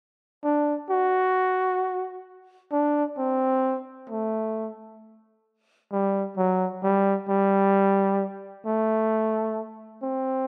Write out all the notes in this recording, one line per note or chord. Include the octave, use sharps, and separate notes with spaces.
D4
F#4
D4
C4
A3
G3
F#3
G3
G3
A3
C4